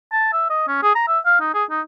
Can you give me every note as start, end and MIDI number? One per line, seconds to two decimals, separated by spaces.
0.12 0.29 81
0.33 0.46 76
0.50 0.67 75
0.68 0.81 61
0.83 0.92 68
0.95 1.07 82
1.08 1.19 76
1.26 1.40 77
1.41 1.52 63
1.54 1.64 68
1.71 1.81 63